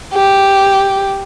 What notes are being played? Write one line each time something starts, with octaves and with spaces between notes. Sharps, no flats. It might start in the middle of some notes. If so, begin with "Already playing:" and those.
G4